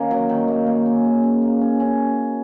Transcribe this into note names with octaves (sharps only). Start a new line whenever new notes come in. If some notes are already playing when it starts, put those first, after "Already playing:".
Already playing: D#3 A#3 C#4
F#3
D#3
A#3
A#3
C#4
C#3
C#4
A#3
C#4
C#4